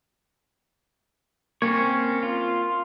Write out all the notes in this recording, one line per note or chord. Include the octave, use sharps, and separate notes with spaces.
A#3 C4 C#4 C#5
F4